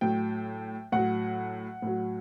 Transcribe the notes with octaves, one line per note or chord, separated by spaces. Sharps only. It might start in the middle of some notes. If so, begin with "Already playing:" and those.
A2 F#3 G5
A2 F#3 F#5
A2 F#3